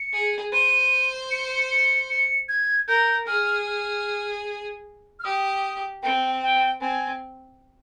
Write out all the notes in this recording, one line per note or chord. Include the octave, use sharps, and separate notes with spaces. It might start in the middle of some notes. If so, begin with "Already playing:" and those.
Already playing: C#7
G#4
C5 D#7
C#7
C#7
C#7
G#6
A#4 G6
G#4 F6
F6
F6
G4 D#6
C4 G5
G5
C4 G#5